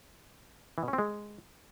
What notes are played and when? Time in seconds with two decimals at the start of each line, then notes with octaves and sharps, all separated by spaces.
0.78 E3
0.83 B2
0.88 C#4
0.93 C4
0.98 G#3